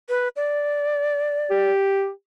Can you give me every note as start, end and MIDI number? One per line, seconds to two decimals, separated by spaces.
0.09 0.28 71
0.36 1.70 74
1.51 2.10 67